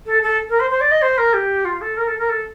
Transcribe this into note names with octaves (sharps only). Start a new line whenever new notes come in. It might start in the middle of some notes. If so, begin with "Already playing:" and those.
A4
A4
A#4
C5
C5
D5
D#5
C5
A#4
G4
F4
A4
A#4
A4
A#4
A4